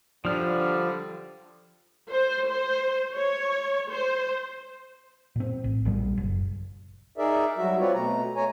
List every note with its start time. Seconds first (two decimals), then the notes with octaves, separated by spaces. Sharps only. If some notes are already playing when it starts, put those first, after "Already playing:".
0.25 D3 F3 G3 D4 F6
2.09 C5
2.47 C5
3.14 C#5
3.90 C5
5.36 A#2 C4
5.64 A1
5.85 A#1 A#2 G3
6.18 F#1
7.18 D#4 G#4 A#4 D5 E5
7.58 F#3 G3 F#4 E5
7.80 C4 F4 B4 C#5 D5
7.94 B2 A3 A#5
8.36 A3 C#5 G#5 A#5